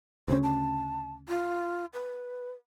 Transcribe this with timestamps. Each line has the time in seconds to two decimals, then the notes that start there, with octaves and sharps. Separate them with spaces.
0.28 D2 C#3 C#4 C5
0.43 A5
1.28 F4
1.93 B4